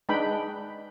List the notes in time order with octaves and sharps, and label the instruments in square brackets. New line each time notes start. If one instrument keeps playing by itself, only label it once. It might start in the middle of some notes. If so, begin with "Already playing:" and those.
[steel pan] G#3 D4 D#4 B4 G5 B5